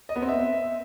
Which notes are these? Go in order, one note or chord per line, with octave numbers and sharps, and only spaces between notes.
D#5
B3
C4
E5